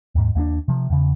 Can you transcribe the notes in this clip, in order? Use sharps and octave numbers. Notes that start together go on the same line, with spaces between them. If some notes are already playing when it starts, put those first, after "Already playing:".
D#2 G#2
D#2 A#3 B3 D4
C3 F3
E2 C#3